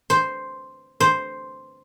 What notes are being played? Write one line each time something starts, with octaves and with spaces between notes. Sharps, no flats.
C5
C5